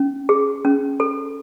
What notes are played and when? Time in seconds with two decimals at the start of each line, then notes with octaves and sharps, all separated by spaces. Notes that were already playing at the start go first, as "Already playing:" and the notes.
Already playing: C#4
0.29 G#4
0.65 C#4
1.00 A4